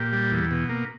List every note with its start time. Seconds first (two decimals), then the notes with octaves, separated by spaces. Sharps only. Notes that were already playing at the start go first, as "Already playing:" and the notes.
Already playing: A#2 G4
0.13 G3
0.31 E2
0.51 B2
0.69 A#3